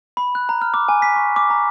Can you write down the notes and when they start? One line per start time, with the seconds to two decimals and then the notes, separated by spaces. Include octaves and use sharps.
0.17 B5
0.35 F#6
0.49 A#5
0.62 F6
0.74 D6
0.89 G#5
1.02 B6
1.16 C#6
1.36 D6
1.50 A#5